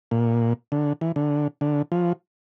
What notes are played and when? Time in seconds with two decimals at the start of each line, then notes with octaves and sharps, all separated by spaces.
0.11 A#2
0.72 D3
1.01 E3
1.16 D3
1.61 D3
1.92 F3